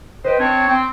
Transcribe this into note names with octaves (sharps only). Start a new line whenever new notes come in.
B4 C5 D#5 G5
C4 D4 C#5
C4